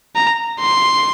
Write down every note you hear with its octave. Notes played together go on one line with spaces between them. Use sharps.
A#5
C6